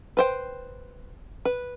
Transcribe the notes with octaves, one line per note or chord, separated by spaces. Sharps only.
B4 C5 G5
B4